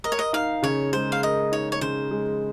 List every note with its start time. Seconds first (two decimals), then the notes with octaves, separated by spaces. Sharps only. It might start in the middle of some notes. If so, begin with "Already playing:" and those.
0.04 A#4 D#5
0.12 C#5
0.19 D#5
0.33 D#4 F5
0.63 C#3 C#5
0.93 G#3 C5
1.12 F5
1.23 A#4 D#5
1.52 D#4 C#5
1.72 C#5
1.81 C#3 C5
2.11 G#3